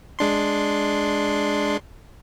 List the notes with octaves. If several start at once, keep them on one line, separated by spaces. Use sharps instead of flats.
G#3 D4 C6